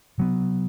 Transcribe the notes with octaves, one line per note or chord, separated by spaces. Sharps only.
C3 F#3 B3